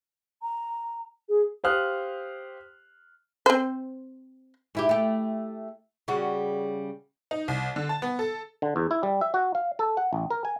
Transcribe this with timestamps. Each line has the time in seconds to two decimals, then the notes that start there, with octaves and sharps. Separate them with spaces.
0.42 A#5
1.29 G#4
1.64 G4 C5 F5 D#6 F6 F#6
3.46 C4 C5
4.75 G#2 E4 G4
4.89 A3 G4
6.08 C#3 G3 F#4
7.31 D#4
7.48 C2
7.76 D3
7.89 A5
8.02 B3
8.19 A4
8.62 D3
8.76 E2
8.91 E4
9.03 G3
9.21 E5
9.34 F#4
9.55 F5
9.79 A4
9.97 F#5
10.13 A1
10.30 A#4
10.45 G#5